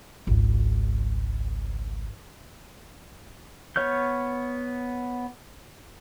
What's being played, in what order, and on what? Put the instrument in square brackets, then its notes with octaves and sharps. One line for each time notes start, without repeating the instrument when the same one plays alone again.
[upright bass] G#1 C#2
[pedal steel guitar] B3 C#5 F6 G6